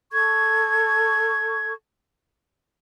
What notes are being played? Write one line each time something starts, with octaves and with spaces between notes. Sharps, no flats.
A4 C#6 G#6